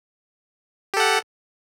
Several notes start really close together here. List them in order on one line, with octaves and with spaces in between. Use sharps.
G4 A4 F#5